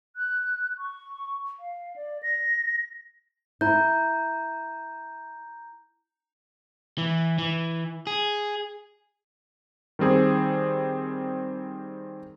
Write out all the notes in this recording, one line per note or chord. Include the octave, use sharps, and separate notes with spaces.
F#6
C#6
F5
D5
A#6
E4 A#5 G6
E3
E3
G#4
D#3 G3 C4 G#4